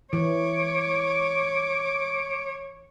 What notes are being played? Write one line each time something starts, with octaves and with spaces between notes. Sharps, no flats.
E3 C#5 D6